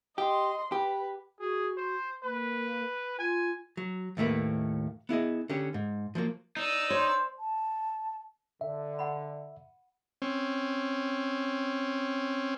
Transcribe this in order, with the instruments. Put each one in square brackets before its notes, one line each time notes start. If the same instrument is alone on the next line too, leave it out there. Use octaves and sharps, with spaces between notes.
[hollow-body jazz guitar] G4 [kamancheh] D#5 C6
[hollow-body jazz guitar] G4 [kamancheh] B4
[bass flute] F#4 [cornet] G#4
[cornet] C5
[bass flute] A#3 [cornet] B4
[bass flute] F4 [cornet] G#5
[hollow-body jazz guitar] F#3
D#2 A2 A3 A#3 B4
B3 E4 G#4 D#5
D3 C#4 G4
G#2
F3 F#3 A#3
[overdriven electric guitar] D#4 [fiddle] D5 E6
[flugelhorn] C5 [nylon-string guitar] C#5
[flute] A5
[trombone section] D3 [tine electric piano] E5
[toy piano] F#5 B5
[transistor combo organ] C4 C#4